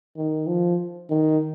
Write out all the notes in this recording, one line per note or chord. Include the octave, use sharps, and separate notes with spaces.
D#3
F3
D#3